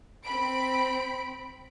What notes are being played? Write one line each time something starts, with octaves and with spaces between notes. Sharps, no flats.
C4 B5 D7